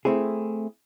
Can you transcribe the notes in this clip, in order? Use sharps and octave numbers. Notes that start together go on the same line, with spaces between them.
A3 C4 E4 G#4